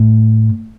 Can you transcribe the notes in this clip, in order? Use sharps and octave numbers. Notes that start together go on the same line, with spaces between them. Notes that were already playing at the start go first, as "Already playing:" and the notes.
Already playing: A2